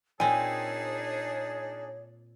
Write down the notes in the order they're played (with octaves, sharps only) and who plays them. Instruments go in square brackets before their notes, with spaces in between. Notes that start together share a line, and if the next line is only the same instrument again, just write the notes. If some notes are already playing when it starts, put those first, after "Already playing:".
[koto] A#2 C4 [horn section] D4 D#4 G#4 [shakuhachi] C#5 [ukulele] G#5